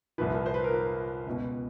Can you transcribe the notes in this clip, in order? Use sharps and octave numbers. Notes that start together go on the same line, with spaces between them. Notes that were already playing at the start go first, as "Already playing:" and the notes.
C2 A#2 F3 B4
C5
B4
A#4
B4
C#2 B2